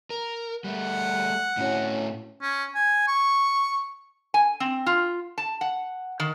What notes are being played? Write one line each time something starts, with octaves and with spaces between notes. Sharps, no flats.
A#4
G3 A3 F#5
A2 C#4 E4 F#4
C#4
G#5
C#6
G#5
C4
F4
A5
F#5
D#3